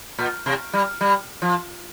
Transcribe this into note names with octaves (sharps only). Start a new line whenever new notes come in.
A#2
C3
G3
G3
F3